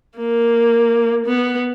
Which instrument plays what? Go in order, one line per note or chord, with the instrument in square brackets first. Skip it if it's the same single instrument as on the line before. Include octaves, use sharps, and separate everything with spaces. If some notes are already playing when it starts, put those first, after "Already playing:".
[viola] A#3
B3